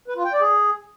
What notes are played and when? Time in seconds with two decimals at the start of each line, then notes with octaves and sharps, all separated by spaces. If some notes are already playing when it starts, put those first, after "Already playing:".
0.08 B4
0.16 F4
0.24 G5
0.33 D5
0.41 G#4